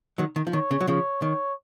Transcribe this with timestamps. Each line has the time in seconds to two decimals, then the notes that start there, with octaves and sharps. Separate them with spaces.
0.18 D#3 F#3
0.36 D#3
0.47 F3
0.53 D#3 C#5
0.71 C#3
0.81 F#3
0.87 C#3 F3 C#5
1.22 D#3 C#5